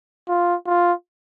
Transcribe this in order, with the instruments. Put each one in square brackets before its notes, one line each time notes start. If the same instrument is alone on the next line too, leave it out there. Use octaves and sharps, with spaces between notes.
[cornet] F4
F4